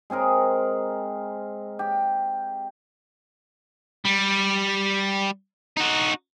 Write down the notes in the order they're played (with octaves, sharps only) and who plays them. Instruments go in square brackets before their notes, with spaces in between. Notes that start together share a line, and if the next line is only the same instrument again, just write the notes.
[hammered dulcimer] G#3 C4 G#4 A#4
G4
[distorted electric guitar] G3
D#4 F#4